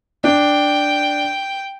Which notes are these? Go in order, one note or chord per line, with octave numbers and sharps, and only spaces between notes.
D4 G5